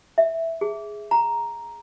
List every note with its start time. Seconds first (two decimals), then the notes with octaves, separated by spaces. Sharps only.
0.18 E5
0.61 G#4
1.11 A#5